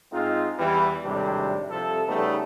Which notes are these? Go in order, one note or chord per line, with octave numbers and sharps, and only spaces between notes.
G#2 G#3 C4 D#4 F4
E2 E3 G3
G#1 A2 C3 G3 A3 D4
C2 C3 F3 A4
C#3 G3 A3 B3 D#4